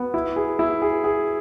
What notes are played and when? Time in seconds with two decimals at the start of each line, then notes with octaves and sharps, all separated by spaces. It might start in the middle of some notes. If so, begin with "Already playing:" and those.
Already playing: B3
0.14 E4
0.36 G#4
0.59 E4
0.82 G#4
1.04 G#4